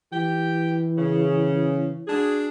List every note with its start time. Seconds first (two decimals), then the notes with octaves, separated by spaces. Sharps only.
0.12 E3 G4 G5
0.98 C#3
2.07 D4 F#4 G#4